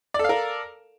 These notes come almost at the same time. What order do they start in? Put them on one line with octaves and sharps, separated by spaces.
D5 A4 F5 A#4